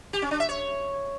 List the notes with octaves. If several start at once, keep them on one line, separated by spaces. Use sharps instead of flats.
G4
C#4
D4
E5
C#5